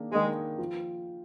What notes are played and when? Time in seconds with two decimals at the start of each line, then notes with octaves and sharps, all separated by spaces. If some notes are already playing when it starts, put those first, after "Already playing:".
Already playing: D#3 A#3 D4 G#4
0.11 D#3 G#3 A#3 D4 G#4
0.59 F3